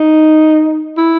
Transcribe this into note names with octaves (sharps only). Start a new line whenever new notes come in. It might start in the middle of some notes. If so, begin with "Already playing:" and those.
Already playing: D#4
E4